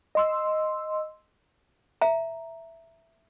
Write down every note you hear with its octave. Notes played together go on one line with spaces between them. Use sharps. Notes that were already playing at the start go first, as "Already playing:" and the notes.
D#5 C6 E6
E5 A#5